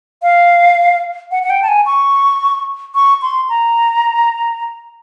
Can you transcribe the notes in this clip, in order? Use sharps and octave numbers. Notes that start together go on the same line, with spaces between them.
F5
F#5
F#5
G5
A5
G#5
C#6
C#6
C6
A#5